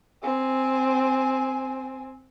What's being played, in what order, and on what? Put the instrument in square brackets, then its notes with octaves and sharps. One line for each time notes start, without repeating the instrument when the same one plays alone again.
[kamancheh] C4 G#5